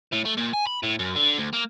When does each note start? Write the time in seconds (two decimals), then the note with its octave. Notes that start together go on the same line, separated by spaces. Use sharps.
0.13 A2
0.25 A3
0.38 A#2
0.54 G#5
0.67 B5
0.83 A2
0.99 F#2
1.16 D3
1.38 D2
1.53 A#3